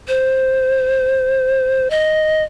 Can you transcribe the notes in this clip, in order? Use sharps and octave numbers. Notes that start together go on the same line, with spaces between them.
C5
D#5